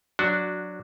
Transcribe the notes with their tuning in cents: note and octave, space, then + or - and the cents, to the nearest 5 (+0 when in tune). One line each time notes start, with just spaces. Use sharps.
F#3 -15 D4 +0 F#4 +0